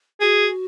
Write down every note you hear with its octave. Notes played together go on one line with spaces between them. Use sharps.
F#4 G#4